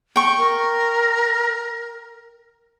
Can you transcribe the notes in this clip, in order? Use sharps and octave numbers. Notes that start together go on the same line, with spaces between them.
G5 C#6
A#4